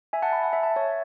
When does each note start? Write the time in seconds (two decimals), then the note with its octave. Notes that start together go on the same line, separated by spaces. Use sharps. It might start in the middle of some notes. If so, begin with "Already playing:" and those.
0.13 E5 G#5
0.22 F#5 A5
0.33 G#5 B5
0.43 F#5 A5
0.53 E5 G#5
0.63 F#5 A5
0.76 C#5 E5